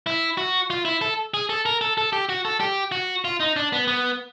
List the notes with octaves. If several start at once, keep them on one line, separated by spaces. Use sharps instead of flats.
E4
F#4
F4
E4
A4
G#4
A4
A#4
A4
A4
G4
F#4
A4
G4
F#4
F4
D#4
D4
B3
B3